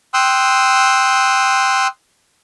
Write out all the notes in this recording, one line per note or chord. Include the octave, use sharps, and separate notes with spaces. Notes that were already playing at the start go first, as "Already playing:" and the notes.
G5 C6 D#6 E6 F#6